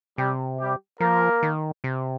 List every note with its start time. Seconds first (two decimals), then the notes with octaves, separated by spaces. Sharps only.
0.18 C3 G3 G4
0.59 G3 G4
1.00 F3 A#3 A#4
1.42 D#3
1.84 C3